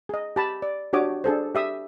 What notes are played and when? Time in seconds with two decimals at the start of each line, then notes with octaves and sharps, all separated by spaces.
0.09 G#4 D#5
0.36 G4 A5 B5
0.62 D5
0.93 D4 F#4 G4 C#5 D6 D#6
1.24 D4 G#4 A4 C5
1.55 G4 E5 D#6